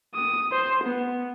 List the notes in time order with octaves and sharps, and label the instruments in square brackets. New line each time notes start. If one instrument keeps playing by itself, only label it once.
[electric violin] D#6
C5
B3